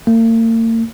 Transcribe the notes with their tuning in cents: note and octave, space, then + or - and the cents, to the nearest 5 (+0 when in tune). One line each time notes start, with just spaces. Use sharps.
A#3 -45